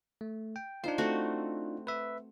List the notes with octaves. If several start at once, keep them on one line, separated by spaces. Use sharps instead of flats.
A3
G5
D4 D#4 F4 C5
A3 C4 F#4
B4 E5